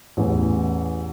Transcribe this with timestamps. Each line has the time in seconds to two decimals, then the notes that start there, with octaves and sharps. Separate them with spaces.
0.17 A1 E2